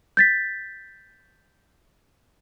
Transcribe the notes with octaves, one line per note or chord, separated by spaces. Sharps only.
G6 A6 B6